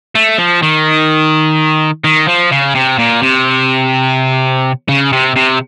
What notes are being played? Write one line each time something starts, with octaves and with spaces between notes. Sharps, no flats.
A3
F3
D#3
D#3
F3
C#3
C3
A#2
C3
C#3
C3
C3